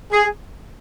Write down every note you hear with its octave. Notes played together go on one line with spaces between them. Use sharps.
G#4